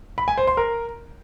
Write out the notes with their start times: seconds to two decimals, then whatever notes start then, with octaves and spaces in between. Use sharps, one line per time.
0.18 B5
0.28 G#5
0.38 C5
0.47 C6
0.57 A#4